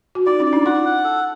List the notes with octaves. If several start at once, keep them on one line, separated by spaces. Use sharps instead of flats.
F#4
D#4 F4 D5
C#4 D#4
D5
D4 E4
D#4 F4 F#5
F#5
A4